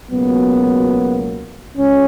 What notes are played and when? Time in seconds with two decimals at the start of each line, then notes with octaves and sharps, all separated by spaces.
0.11 C#2 B2 F#3 A#3 B3
1.77 C#2 C#4